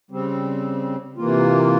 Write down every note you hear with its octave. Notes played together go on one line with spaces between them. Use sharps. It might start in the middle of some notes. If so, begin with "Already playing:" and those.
C#3 G3 C4
C3 E3 A#3 F4